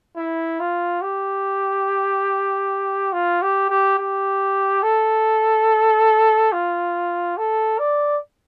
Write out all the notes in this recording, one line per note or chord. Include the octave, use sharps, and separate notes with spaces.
E4
F4
G4
F4
G4
G4
G4
A4
F4
A4
D5